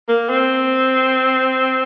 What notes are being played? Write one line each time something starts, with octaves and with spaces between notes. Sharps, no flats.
A#3
C4